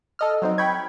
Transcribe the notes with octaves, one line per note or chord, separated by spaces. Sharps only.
A4 D#5 F6
F#3 C4 D#4
G5 B5 C#6 G#6